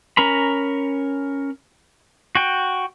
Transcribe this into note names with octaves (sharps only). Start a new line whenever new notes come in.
C#4 A#4 A#5 B5
F#4 G5